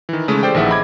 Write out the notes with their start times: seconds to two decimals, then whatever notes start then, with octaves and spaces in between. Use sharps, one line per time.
0.09 D#3 E3
0.28 C#3 E3 G#3 A3
0.43 G4 A4 C5 D5 G5
0.54 A#1 D#3 E3 G#4 E5 F#5
0.70 D#5 B5 D6 G#6